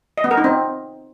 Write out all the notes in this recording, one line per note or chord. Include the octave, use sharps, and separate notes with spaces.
D#5
B3
A#4
D#4
C4